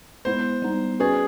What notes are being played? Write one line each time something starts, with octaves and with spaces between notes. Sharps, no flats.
G#3 B3 E4 C5
G3 B3 D#4
C#4 F#4 G#4 B4 D5